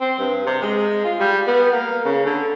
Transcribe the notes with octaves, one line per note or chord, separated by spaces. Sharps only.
C4
G2
C3
G#3
F4
G3
B3
A#3
C#3
D3